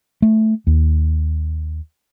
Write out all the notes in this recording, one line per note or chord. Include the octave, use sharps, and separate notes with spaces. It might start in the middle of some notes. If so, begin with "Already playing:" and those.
A3
D#2